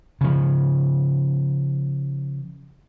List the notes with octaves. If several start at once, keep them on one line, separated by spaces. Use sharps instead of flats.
C#3 F3